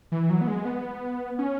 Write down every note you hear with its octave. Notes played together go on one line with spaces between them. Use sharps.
E3
F#3
B3
G#3
B3
C#4